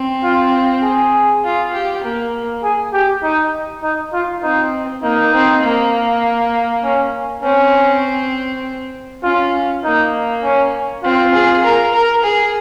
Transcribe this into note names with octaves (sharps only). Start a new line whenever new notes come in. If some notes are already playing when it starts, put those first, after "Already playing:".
Already playing: C4
F4
G#4
F4
G4
A#3
G#4
G4
D#4
D#4
F4
C4 D#4
A#3 D#4
C4
A#3
C#4
C4 C#4
C#4 F4
A#3 D#4
C#4
C4 F4
G#4
A#4
A#4
G#4